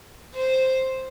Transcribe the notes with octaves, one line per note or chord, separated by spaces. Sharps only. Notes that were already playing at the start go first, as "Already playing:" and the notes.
C5